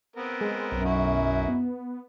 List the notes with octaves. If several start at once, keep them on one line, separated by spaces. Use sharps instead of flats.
B3 C4 A#4
G#3
B1 F#2
D#4 E4 F#4
B3